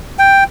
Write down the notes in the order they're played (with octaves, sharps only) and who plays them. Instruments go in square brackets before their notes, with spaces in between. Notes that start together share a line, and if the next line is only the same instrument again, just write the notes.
[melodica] G5